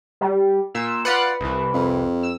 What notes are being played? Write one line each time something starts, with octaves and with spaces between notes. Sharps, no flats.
G3
A#2 E6
F4 B4 D5 F#5
C2 E3
F2
E6